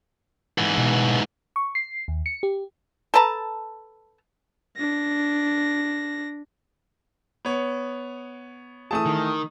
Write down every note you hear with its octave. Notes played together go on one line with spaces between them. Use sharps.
G#2 E3
B2
C#6
C7
D#2
C#7
G4
A4 B4 A5 A#5
D4 A#6
B3 C#5
E3 A3 G#4 A5 D#6
D#3